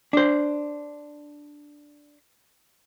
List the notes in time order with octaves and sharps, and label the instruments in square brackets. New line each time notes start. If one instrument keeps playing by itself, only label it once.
[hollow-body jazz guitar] D4 C5